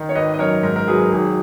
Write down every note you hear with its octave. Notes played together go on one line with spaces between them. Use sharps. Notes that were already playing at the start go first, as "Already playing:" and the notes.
Already playing: D#3
C#5
G#1 B4 D#5
D#5
F#2 A#4 C#5
G#2 A#4
A#4
F#3 G#4 B4
A#4
G#1 G#4